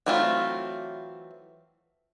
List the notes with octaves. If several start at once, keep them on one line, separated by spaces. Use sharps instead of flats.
E3 F#3 A3 C4 F4